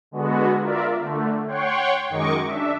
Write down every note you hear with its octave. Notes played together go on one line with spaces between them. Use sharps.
D3 G#3 B3 F#4
F4 A#4 D5 E5
D3 A3
C#5 F#5 G5 C6 C#6
F#2 D#3 G#3 D#5 C#6 D6
D4 E5